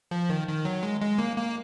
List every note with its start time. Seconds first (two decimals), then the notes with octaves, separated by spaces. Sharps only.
0.11 F3
0.30 D#3
0.47 D#3
0.65 F#3
0.83 G#3
1.01 G#3
1.18 A#3
1.37 A#3